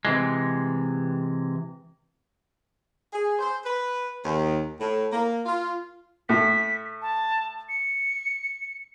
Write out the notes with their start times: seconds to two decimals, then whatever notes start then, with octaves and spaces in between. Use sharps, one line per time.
0.05 C3 E3 G#3
3.13 G#4
3.39 C5
3.63 B4
4.23 D#2
4.80 A2
5.12 A#3
5.46 F4
6.29 A2 B6
7.02 A5
7.69 C#7